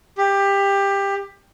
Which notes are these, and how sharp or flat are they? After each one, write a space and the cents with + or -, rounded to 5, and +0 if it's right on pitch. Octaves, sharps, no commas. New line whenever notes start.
G4 +15